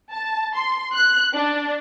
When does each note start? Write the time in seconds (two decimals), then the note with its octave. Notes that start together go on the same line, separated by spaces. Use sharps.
0.12 A5
0.54 C6
0.94 F#6
1.34 D4